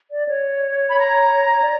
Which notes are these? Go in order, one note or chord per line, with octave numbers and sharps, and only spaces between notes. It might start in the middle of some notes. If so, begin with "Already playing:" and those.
D5
C#5
B5
A#5
D5